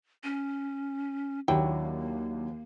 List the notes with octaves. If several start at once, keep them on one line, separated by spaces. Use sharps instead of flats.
C#4
D#2 F#3 A#3 D4 E4 G5